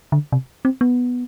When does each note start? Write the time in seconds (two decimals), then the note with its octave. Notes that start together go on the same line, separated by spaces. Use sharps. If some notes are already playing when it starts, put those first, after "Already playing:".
0.12 D3
0.32 C3
0.65 C4
0.81 B3